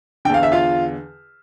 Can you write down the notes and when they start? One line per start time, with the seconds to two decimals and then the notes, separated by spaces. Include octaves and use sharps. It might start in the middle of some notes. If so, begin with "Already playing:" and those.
0.25 D3 G5
0.30 E2 F5
0.43 E5
0.52 F4 F5